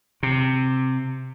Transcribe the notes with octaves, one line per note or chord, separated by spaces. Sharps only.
C3